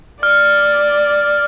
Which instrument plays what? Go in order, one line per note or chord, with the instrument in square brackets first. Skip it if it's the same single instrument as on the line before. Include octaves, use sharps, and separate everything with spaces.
[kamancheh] D5 [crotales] F6